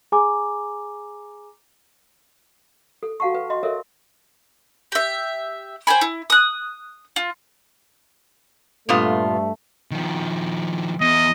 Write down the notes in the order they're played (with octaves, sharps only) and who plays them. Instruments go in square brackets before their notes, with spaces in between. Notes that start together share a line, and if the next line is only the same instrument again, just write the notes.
[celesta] G#4 G#5 A#5 D6
[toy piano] A4
F#4 F5 F#5 A5 C#6
B4
D#5 C6
A4 A#4 C#5 D#5 E5
[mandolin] G4 E5
C5 G5 G#5 B5
E4
D#6 F#6
F4
[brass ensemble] G2 A3 [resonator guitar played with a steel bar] A#2 B3 F4
[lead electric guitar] D#3 F3
[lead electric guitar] E2 [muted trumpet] D#5